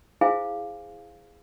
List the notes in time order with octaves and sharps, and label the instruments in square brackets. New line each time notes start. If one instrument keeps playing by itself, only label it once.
[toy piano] E4 G#4 C5 F5 G#5